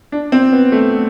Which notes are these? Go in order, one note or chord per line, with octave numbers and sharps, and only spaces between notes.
D4
C4
B3
A3